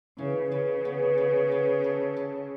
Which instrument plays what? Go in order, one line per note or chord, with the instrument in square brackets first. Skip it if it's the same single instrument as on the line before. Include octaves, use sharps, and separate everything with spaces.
[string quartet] C#3 [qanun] E3
[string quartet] C#3 [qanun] B4
[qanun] B3
B3
B3
A4
A4